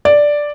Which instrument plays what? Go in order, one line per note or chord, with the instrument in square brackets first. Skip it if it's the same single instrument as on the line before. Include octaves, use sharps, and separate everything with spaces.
[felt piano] D5